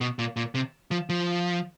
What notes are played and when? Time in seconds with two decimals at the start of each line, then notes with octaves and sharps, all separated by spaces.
0.01 B2
0.19 A#2
0.36 A#2
0.55 C3
0.91 F3
1.09 F3